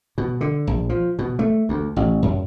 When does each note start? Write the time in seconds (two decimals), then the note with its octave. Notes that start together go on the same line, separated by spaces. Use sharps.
0.18 B2
0.41 D3
0.67 A#1
0.89 F3
1.19 B2
1.39 A3
1.69 D2
1.96 A1
2.22 F#2